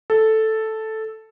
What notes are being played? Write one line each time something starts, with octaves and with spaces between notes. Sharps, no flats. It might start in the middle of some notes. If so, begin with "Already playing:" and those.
A4